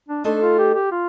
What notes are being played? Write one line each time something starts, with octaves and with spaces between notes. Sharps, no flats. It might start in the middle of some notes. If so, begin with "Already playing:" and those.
D4
A3 D4 D#4 A4 C5
F4
G4
G4
F4